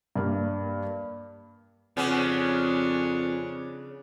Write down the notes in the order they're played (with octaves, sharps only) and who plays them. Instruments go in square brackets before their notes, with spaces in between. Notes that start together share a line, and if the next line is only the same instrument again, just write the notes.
[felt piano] G2 A#3
[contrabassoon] F2 [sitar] C#3 B3 C#4 [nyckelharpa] D4 C#5